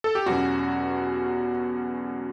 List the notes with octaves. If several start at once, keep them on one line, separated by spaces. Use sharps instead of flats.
A4
G4
E2 B2 F#3 C#4 F#4